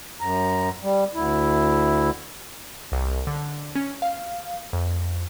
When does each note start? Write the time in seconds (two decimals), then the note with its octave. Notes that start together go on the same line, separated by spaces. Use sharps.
0.21 F#2 A#5
0.82 G3
1.14 D2 E4
2.92 C2
3.27 D3
3.75 C#4
4.02 F5
4.73 F2